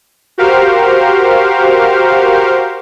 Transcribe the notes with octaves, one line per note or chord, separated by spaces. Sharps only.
F#4 G4 A#4 C5 F5